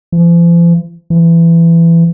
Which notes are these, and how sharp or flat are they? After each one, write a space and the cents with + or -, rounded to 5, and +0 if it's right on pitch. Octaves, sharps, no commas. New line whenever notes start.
F3 -45
E3 +20